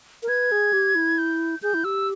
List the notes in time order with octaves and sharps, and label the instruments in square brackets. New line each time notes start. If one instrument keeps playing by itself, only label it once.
[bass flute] A#4
[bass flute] B4 [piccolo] G#6
[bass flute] G#4
G4
E4
[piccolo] G6
[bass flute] G#4 [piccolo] G6
[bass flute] E4
[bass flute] G4 [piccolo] E6